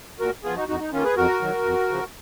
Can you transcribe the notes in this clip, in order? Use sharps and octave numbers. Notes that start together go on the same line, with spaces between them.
A#2 F#4 A#4
F3 B3 F4 G#4
D#4 F#4
F2 D#4 F#4
D#4
D#3 A#3 C#4 F4
G#4 B4
F2 F#4 A#4
D#3 F#3
F2
C#3 F3